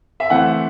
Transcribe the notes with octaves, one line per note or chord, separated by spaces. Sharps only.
E5
E3 A3 C4 F#5